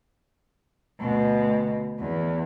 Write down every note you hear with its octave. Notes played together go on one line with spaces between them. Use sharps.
D2 B2
E2